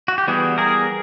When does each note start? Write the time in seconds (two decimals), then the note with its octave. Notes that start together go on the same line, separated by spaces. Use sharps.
0.08 F#4
0.18 G4
0.28 E3 G3 B3 F#4 G#4
0.58 G#4 A#4